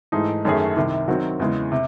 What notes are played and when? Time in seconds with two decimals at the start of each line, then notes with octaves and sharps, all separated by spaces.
0.12 G#2 E3 A3 D#4 G#4
0.45 F#2 D#3 A3 C#4 G#4
0.77 C2 C3 D#3
1.08 D#3 F#3 C4 F#4
1.40 E2 C#3 E3 G#3
1.72 C3